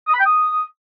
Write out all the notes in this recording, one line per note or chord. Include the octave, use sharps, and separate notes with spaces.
D#6
B5
G5
D#6